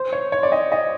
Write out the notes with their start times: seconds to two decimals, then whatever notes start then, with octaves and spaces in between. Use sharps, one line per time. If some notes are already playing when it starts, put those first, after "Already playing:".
Already playing: C5
0.12 C#5
0.32 C#5
0.43 D5
0.52 D#5
0.72 D#5